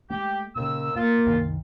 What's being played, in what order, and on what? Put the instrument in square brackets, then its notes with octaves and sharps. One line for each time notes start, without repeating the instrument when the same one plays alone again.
[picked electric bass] G#3 A3 [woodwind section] G4
[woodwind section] D#2 E6 [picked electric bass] A#2 C#3
[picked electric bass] A2 [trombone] A#3 [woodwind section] F4
[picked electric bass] C2 F#2 D#3